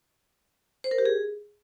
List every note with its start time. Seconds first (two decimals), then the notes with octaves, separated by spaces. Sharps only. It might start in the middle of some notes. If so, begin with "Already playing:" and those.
0.84 C5
0.91 A#4
0.98 G4
1.05 G#4